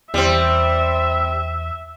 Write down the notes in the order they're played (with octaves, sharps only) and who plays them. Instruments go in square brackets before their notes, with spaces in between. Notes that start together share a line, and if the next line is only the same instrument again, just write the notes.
[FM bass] E2 [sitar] G3 C4 [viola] E5